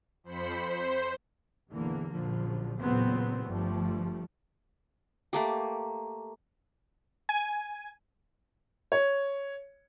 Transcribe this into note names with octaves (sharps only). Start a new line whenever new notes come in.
F2 C5 B5 B6 C#7
C5
A#1 E2 D3 E3 A#3
A#1 F#2 D3 F3
E2 A#2 C#3 F#3 B3 C4
G1 G2 F3 G3 A3
A3 A#3 G4
G#5
C#5